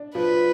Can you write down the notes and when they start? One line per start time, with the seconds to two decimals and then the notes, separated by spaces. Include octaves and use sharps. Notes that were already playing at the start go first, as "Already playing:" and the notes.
Already playing: D4
0.15 F3 B4